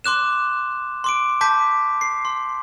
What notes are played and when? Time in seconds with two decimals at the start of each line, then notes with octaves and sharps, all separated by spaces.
0.04 C6 D6 F#6 E7
1.04 C6 D6 D7
1.41 A5 D6 G6 B6
2.01 C7
2.25 C6